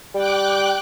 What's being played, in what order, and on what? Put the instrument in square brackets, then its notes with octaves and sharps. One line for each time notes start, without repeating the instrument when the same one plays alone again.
[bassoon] G3 [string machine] G5 D6 F#6